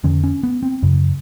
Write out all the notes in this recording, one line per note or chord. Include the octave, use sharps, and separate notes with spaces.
F2 D3 C#4
C#4
B3
C4
F#2 C#3